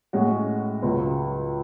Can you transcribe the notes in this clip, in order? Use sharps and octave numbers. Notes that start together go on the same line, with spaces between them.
A2 G#3 C#4 F#4
C#2 C#3 F#3